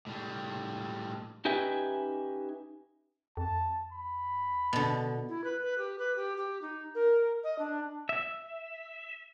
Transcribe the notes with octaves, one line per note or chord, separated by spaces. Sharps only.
A2 G3
C#4 D#4 G4 B4 E5 G#5
F2 A5
B5
B2 D3
E4
B4
B4
G4
B4
G4
G4
D#4
A#4
D#5
D4
E5